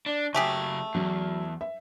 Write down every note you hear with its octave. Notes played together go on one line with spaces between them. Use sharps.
D4
C#3 F#3 A3 G4 G#4
E2 F#3
E5